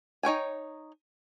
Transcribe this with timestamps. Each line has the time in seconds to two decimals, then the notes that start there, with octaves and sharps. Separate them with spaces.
0.23 D#4 C#5 G5 G#5